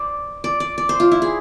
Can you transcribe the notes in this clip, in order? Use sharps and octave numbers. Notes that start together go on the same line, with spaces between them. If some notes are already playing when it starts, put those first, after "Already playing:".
Already playing: C5 D5
D5
D5
D5
C5
F4
E4
G#4